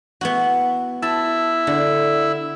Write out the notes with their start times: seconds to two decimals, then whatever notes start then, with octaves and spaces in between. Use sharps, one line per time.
0.21 B3 E4 F#4
1.02 E4 A5
1.67 D3